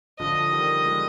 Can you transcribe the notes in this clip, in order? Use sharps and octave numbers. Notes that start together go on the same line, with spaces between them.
D3 F3 D#5
D#3 G3
F3 G#3